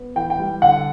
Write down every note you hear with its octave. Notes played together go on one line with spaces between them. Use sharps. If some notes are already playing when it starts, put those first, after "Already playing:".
Already playing: B3
E3 G5
G5
G3
D3 F#5